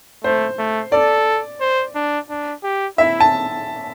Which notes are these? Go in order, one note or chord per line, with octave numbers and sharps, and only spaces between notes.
A3 C5
A3
A4 D5
C5
D4
D4
G4
E4 E5
A5